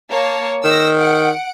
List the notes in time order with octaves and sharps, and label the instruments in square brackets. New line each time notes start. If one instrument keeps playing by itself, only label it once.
[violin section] A#3 C#5 A5
[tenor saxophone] D#3 [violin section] E6 A#6
[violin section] F#5 D7